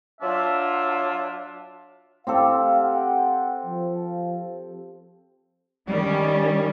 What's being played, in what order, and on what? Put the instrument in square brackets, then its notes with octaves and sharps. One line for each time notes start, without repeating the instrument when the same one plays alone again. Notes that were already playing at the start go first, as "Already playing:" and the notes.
[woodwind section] F#3 D4 F4 E5
[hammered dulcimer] C4 G4 A4 [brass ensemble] F5
[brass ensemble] F#5 G5
F3
[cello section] D#3 G3 C#4